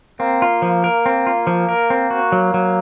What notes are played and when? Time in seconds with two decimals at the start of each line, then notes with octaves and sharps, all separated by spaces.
0.20 A#3 C4
0.42 F4
0.62 F3
0.84 A#4
1.06 C4
1.27 F4
1.47 F3
1.69 A#4
1.90 C4
2.10 F#4
2.32 F#3
2.54 F#3